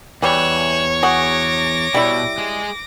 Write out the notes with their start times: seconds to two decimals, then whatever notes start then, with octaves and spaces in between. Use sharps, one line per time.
0.22 E2 E3 G3 C#5 F#6 E7
1.03 F#4 G#4 D6 A#6
1.94 B2 G3 E4
2.38 G#3 G#4